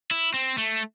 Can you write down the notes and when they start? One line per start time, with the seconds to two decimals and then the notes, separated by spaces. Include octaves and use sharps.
0.11 E4
0.34 C4
0.58 A3